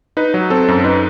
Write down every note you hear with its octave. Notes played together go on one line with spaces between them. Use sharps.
D#4 B4
F#3
C4 A4
F#2
D#4 B4